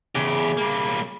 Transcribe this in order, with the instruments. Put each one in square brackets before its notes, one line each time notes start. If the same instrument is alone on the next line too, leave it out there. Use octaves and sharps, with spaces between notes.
[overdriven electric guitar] E2 G4 [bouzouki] C#3
[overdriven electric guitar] G3 A#3